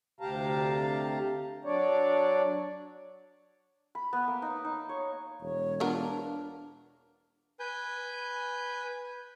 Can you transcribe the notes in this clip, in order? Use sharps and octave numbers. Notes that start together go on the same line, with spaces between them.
D2 C3 G4 F5 A5 A#5
F#3 D4 C#5 D5
B5
B3
A#3
D#4
D#4
C#5
E1 C#5
B3 D4 F4 A#4
B4 G#5 G6